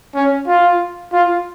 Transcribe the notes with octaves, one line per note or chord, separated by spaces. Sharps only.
C#4
F4
F4